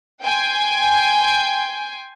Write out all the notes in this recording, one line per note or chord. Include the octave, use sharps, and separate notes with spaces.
G5 G#5 C6